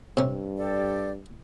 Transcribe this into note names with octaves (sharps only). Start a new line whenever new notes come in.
G2 C3 C#4
G4 A4 D5